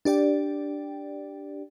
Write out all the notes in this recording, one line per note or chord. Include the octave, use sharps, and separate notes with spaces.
D4 G4 D5 G5